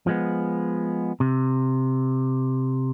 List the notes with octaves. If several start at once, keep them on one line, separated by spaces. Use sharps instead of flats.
F3 G#3 B3
C3